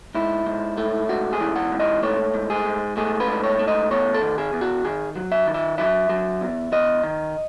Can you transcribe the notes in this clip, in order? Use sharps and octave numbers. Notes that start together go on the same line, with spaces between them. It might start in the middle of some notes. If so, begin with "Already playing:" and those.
G#2 E4
G#2
A3
G#2 F#4
G#4
E3
F#5
G#2
D#5
A3 C#5
G#2
G#4
G#2
A3 G#4
B4
G#2
C#5
A3
D#5
E2 C#5
A4
D#3
G#4
E2
F#4
D#3 G#4
F#3
E5
D#3
E5
F#3 E5
F#3
E2
E2 D#5
D#3